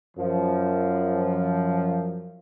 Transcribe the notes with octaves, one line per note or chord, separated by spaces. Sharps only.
F#2 F3